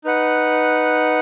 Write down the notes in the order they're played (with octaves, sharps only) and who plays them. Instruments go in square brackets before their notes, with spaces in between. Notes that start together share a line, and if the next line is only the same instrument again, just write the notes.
[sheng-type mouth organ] D#4 B4 F#5